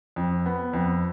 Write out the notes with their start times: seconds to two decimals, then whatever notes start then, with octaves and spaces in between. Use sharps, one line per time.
0.16 F2
0.46 B3
0.73 F2